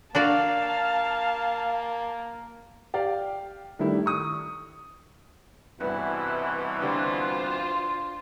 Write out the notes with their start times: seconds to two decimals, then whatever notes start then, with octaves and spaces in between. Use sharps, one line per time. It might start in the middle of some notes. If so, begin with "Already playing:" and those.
0.15 A#3 D4 F#4 D5 F5 A5
2.94 G4 D5 F5 G5
3.79 D#3 G3 A3 D4 E4
4.06 C#6 D#6
5.80 C2 G2 B2 E3 B3 E4 F#4 B4
6.82 D3 F4 G4 C5 D5